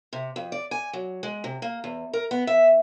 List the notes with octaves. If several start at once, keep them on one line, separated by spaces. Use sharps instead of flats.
C3
F2
D5
G#5
F#3
G#3
C3
A#3
E2
A#4
B3
E5